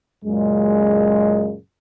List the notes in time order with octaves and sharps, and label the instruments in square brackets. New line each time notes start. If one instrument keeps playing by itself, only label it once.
[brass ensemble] F#2 A#2 C#3 G#3